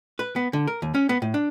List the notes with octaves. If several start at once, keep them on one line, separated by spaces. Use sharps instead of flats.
B4
B3
D3
A#4
D#2
C#4
B3
A2
D4